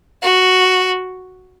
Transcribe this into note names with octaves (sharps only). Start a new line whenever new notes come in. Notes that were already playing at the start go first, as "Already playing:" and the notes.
F#4